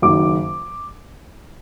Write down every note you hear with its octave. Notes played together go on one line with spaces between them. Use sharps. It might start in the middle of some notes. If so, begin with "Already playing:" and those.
F#1 F#2 D#3 D6